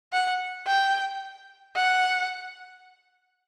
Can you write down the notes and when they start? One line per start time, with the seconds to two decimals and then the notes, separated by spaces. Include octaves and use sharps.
0.13 F#5
0.67 G5
1.76 F#5